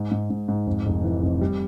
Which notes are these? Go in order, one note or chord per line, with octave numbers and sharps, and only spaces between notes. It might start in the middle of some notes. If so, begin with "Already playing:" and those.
Already playing: G#2
G#2
G#2
G#2
F2
F1
E3
F1
G3